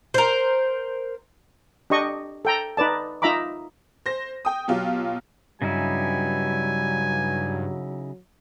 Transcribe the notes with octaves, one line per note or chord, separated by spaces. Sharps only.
A#4 C5
D4 G4 D#5 C#6
A4 G5 A#5
D#4 B4 D5 A5
D#4 F4 E5 A#5 B5 D6
C5 A#6
G5 D#6
B2 F#3 F4 G4
G2 C#3 F#3 D#4 E4 G#5